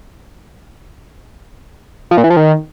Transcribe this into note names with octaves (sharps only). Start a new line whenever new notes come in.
F3
A#2
E3
F3
D#3